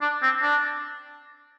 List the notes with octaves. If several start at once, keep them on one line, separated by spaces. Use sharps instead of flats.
D4
C4
D4